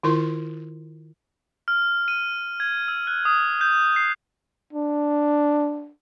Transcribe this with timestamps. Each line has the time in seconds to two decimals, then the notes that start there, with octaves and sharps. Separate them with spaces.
0.03 D#3 E4 F4 A#4 C6
1.68 F6
2.08 D#7
2.60 G#6
2.88 E6
3.07 F#6
3.25 D#6
3.61 G6
3.96 C7
4.73 D4